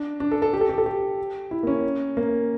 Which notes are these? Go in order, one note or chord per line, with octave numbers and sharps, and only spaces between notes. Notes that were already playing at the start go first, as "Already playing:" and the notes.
Already playing: D4
D4
A4
A4
G4
A4
G4
A4
G4
E4
A#3
C#4
A#3